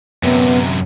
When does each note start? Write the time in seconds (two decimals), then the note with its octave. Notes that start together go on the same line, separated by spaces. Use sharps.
0.23 F#2 C3 B3